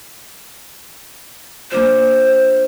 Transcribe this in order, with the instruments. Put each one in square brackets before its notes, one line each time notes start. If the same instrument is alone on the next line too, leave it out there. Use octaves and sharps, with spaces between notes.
[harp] A#3 D4 F4 [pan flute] C5